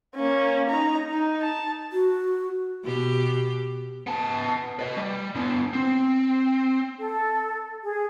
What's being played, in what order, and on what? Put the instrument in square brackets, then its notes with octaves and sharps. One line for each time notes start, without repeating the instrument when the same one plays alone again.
[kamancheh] A#3 C#4
D#4 A#5
D#4
A5
[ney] F#4
[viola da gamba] B2 G4
[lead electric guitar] B3 A5
B4 D#5
G3
D3 B3
C4
[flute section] A4
G#4